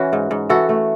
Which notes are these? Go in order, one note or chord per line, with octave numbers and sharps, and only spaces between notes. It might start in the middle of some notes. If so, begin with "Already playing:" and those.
Already playing: E3 C#4 F#4
G#2
G#2
E3 F#4 A4
A3